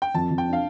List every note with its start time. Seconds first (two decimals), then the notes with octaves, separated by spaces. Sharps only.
0.02 G5
0.15 F2 A5
0.31 F2
0.38 G5
0.47 D4
0.53 F5